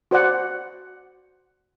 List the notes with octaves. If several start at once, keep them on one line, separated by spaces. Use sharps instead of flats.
F#4 C5 D5 F#5